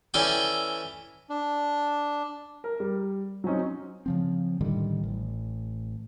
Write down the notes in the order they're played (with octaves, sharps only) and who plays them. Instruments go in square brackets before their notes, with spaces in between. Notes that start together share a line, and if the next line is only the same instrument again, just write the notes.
[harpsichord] E3 C#4 A4 D5 G5
[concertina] D4
[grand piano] A#4
G3
F#3 C4 C#4 D#4
[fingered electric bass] C#3 F3 C4
A2 D3 D#3 G3
A1